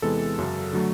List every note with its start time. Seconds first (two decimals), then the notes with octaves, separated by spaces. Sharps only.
0.02 E2 C3 E3 G#3 B3 A4
0.38 F#2 C#3 F#3
0.73 D3 F#3 A3